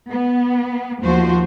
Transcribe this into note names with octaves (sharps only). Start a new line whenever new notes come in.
B3
D#2 F3 F#4 C5